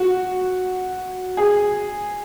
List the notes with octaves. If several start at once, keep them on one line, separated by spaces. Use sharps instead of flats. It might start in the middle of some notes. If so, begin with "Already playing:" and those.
Already playing: F#4
G#4